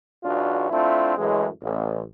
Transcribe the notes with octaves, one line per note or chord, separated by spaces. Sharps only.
B1 E2 D4 F4 F#4
A3 C4 D4 E4 F4
F#2 A2 E3 G#3
A1